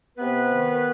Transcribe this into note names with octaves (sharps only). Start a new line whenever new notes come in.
C3 B3 B4
D#3